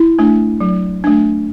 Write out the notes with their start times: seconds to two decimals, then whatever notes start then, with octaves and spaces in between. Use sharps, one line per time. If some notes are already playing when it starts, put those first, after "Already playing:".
Already playing: E4
0.19 A3 D4
0.61 F#3
1.04 A3 D4